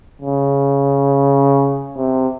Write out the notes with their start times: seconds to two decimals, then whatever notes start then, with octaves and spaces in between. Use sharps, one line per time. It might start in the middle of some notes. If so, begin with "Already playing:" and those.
0.22 C#3
1.96 C3